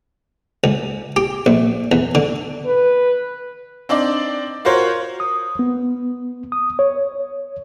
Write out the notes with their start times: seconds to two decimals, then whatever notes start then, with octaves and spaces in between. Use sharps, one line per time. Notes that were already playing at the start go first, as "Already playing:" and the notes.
0.64 C#2
1.16 G4
1.46 A#1
1.92 E2
2.15 D3
2.65 B4
3.89 C4 D4 D#4 D5
4.65 F4 F#4 A#4 C5 C#5
5.20 D#6
5.59 B3
6.52 D#6
6.79 C#5